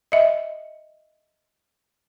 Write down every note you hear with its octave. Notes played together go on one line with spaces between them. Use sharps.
D#5 E5